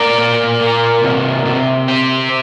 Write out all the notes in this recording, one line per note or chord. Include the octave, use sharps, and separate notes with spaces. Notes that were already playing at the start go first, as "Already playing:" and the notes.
Already playing: A#3 A#4 D5
A#2
A#3
C3
C3
C4 G4 C5